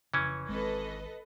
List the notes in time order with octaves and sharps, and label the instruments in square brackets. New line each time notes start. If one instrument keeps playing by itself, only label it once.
[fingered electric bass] F1 C#3 [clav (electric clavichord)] E3 C#4
[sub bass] G#1 [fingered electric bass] G#3 C4 [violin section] A4 B4 D#5